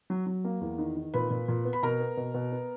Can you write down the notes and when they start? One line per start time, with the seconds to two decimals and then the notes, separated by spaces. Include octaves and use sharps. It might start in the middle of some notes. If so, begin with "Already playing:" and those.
0.10 F#3
0.27 F#3
0.45 A#3
0.61 E2
0.79 D#3
0.97 D#3
1.13 A#2 B4 B5
1.30 A#2
1.48 A#2
1.65 B3
1.73 B5
1.83 B2 A#4 A#5
2.00 B3
2.17 B2
2.34 B2
2.52 B3